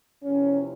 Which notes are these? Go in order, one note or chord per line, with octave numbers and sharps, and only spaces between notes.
E2 C3 F3 C#4